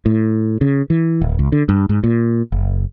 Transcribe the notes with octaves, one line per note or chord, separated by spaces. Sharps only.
A2
C#3
E3
D1
C#2
D3
G2
G#2
A#2
F#1